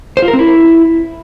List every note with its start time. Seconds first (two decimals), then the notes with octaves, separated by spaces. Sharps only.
0.17 C5
0.22 F4
0.28 A#4
0.33 C4
0.39 E4